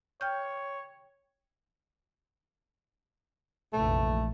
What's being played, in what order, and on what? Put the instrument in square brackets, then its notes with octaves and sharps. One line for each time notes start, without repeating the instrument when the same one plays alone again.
[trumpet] C#5 [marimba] G5 F6 G6
[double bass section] F1 A#1 E3 [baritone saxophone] A3